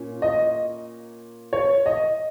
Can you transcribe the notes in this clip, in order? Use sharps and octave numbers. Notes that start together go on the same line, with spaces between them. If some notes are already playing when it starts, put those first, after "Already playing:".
Already playing: A#2 A#3 C#4
D#5
C#5
D#5